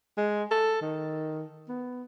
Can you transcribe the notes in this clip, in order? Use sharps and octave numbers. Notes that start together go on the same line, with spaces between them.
G#3
A4
D#3
B3